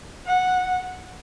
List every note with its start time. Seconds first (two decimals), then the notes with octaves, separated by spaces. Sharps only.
0.26 F#5